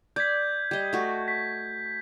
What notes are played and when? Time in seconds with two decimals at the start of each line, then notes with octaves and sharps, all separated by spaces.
0.16 D5 G6 G#6 B6
0.71 G3 D#5
0.93 A3 F#4
1.28 B6